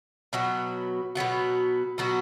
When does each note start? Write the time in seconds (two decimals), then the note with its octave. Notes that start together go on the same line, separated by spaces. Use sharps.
0.33 B2 F#3 B3 F#4
1.15 B2 F#3 B3 F#4
1.98 B2 F#3 B3 F#4